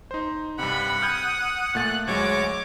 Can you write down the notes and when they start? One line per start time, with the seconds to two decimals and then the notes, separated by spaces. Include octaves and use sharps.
0.11 D#4 C5
0.59 G2 C3 F#5 B5
1.02 D#6 F6 G6 G#6
1.75 A#2 A3 F#6 A6
2.07 D2 F#3 G#3 C#5 D6